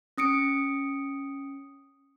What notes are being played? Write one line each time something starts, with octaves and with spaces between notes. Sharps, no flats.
C#4 D#6 C#7 D7